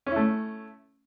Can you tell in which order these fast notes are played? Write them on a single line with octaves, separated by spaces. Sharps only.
C#4 E4 A3